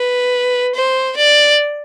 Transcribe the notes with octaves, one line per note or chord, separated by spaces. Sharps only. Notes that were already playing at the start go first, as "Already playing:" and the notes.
Already playing: B4
C5
D5